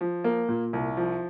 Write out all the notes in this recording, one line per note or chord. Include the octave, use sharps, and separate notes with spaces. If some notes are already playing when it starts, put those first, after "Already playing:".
F3
A#3
A#2
C2
F3